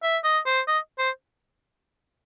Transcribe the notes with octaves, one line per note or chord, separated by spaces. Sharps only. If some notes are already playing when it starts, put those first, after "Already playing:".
E5
D#5
C5
D#5
C5